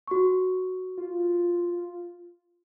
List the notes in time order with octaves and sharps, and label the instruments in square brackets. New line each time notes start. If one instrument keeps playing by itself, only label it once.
[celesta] F#4 C#6
[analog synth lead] F4